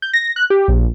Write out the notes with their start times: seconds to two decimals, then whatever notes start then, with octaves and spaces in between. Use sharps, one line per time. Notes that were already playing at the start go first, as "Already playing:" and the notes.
0.02 G6
0.13 A#6
0.36 F#6
0.50 G4
0.68 A#1